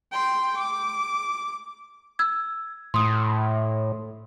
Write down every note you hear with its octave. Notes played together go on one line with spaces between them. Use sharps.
G5 C6
D6
E6 G#6
A2 C6 D#6